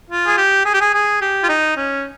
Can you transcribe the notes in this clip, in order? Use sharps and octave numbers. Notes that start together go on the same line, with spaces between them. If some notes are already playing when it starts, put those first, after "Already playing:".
F4
G#4
G4
G#4
G4
G#4
G#4
G4
F4
D#4
C#4